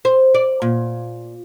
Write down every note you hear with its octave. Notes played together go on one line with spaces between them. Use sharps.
C5
D5
A#2